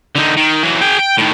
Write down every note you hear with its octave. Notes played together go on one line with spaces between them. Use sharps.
D3 D#4
D#3
E3 F#3
G#4 G5
G5
A2 D#3